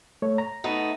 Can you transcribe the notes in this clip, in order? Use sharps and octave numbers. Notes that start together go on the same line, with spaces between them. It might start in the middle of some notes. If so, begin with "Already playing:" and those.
A3 C#5
A#5
A3 B3 D#4